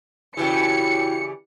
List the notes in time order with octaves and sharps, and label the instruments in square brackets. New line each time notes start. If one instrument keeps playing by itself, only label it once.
[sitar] C#3 E3 G3 [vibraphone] E4 F#4 G5 [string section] C#7